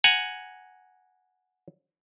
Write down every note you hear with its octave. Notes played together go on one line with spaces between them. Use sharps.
F#5 G#5 A#5